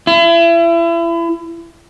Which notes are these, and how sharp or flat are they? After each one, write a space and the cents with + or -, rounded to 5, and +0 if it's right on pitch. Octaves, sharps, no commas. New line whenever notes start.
E4 +35